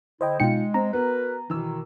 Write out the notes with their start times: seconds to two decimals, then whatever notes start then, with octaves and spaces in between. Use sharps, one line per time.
0.21 D3 E4 C5 D#5 G5
0.40 B2 G#3 D#4 F4 G5 C#7
0.74 C4 A#5
0.93 B3 F#4 A#4 B4
1.50 B2 D#3 E3 E6